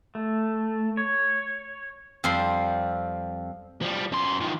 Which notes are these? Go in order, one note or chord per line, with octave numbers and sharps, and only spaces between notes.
A3
C#5
F2 G3 C4 C6
F3 G3
F#2 C6
D#3 F3